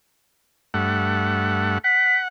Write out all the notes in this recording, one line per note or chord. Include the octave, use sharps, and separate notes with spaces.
G2 A3 F#5
F#5 B6